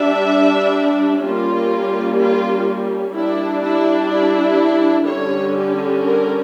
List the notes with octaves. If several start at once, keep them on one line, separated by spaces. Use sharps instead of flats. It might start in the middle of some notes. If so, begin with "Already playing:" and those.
Already playing: G3 D4 E5
G3 A#3 C#4 F4
F4
G3 D4 E4
E4
E4
D3 G3 C#4 C#5
G4
A#4